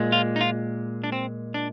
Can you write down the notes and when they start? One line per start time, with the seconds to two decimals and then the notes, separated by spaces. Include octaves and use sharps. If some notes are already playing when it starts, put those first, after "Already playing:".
Already playing: A#2 G#3
0.12 F4
0.36 D#4
0.41 F4
1.04 D4
1.12 C4
1.54 D4